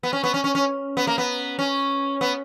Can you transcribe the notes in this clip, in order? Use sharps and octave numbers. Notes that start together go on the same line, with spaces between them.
B3
C#4
B3
C#4
C#4
C#4
B3
A#3
B3
C#4
B3